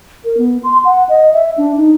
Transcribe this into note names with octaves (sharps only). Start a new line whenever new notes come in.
A#4
B3
C6
F#5
D#5
E5
D4
D#4